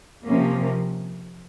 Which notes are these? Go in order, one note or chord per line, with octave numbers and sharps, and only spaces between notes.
C3 F3 A#3 C#4